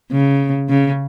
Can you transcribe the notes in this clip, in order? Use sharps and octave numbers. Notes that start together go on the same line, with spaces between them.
C#3
C#3